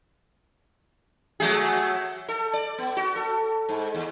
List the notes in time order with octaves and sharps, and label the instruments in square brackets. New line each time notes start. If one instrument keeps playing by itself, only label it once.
[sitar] F#3 A3 G#4
A4
D5
B3
F#4
A4
G#2
D#2